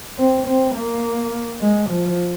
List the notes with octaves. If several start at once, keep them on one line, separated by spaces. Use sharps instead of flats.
C4
C4
A#3
G#3
F3